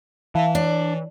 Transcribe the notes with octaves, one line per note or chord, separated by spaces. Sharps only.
E3 E5 F5 A5
D4 C#5